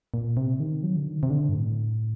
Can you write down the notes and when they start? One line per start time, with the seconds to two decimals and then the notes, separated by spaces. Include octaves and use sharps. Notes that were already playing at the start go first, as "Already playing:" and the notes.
0.14 A#2
0.37 C3
0.60 D#3
0.83 F#3
0.96 D3
1.07 D#3
1.23 C3
1.30 D3
1.49 G2
1.53 A2